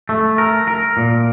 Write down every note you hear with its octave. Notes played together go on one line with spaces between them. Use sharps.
A3
A#4
A#4
A#2